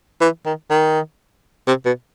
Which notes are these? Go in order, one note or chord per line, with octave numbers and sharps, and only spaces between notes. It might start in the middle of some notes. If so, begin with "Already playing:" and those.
E3
D#3
D#3
C3
B2